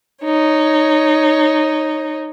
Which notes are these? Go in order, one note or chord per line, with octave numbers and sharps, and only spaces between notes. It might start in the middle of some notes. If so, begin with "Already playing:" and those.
D#4 C#5